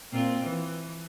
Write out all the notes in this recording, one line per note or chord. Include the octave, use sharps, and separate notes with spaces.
A#2 C4 F4
E3